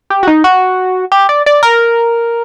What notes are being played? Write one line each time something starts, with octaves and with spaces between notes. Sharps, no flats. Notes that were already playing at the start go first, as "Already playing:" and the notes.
G4
F#4
D#4
F#4
G4
D5
D5
A#4